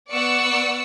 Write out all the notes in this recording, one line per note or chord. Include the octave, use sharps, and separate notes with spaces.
B3 D5 F#5 C#6 E6 C#7